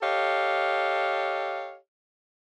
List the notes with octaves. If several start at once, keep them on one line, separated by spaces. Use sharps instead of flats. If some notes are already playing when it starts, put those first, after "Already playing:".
G4 A4 C#5 D#5 F5